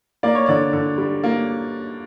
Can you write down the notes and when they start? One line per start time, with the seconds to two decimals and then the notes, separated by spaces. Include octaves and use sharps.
0.23 A#3 D5
0.35 C#5
0.46 D3 D5
0.73 D3
0.98 G3
1.24 A#3